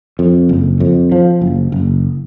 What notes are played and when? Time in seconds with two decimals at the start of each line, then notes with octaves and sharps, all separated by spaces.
0.19 F2
0.49 F#1
0.80 F2
1.12 F3
1.42 F#1
1.72 F#1